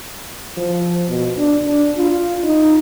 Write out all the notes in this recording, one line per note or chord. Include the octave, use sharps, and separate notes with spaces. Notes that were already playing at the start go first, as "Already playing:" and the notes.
F3
B2
D4
D4
F4
D#4